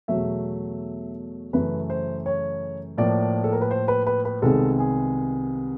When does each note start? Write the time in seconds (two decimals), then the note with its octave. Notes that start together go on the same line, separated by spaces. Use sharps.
0.08 E2 B2 F#3 A3 E5
1.53 F#2 C#3 E3 A3 B4
1.90 C5
2.26 C#5
2.98 A2 F3 A#3 D5
3.44 A4
3.52 A#4
3.61 B4
3.71 C5
3.88 B4
4.07 B4
4.25 B4
4.42 C2 C3 D#3 G#3 B3 A4
4.79 G#4